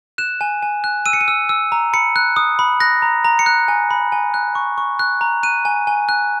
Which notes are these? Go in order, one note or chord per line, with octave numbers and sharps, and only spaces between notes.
F#6 E7
G#5
G#5
F#6
E6 D#7
C#7
D#7
E6
E6
A#5
B5 C#7
F#6
D#6
B5
F#6 A#6
A#5
A#5
C#7
F#6
G#5
B5
G#5
F#6
C#6
C#6
F#6
A#5
F#6 D#7
G#5
G#5
F#6